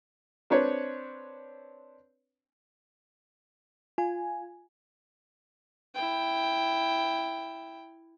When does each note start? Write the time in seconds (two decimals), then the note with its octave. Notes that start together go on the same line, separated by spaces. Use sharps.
0.50 C4 D4 B4 C#5
3.98 F4 G#5
5.95 E4 G5